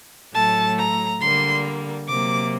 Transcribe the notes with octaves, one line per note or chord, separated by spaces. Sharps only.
A2 F#3 A3 A5
A#5
D3 G3 A#3 C6
C3 F#3 A#3 D6